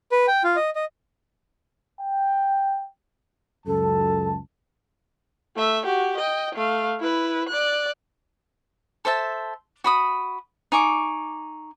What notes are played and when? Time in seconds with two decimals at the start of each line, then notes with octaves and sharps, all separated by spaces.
0.12 B4
0.28 G5
0.44 F4
0.56 D#5
0.76 D#5
2.01 G5
3.67 C#2 F#2 A4 A5
5.56 A3 E5
5.85 F#4 G4
6.17 D#5 G5
6.55 A3 F5
7.00 E4 B4
7.49 D5 F#6
9.05 A4 C5 E5 A5
9.84 F#4 B5 D#6
10.72 D#4 G#5 C#6 D6